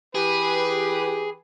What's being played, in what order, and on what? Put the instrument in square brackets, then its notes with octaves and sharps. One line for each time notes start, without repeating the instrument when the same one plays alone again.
[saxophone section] E3 G4 [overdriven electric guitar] G#4 [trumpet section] B4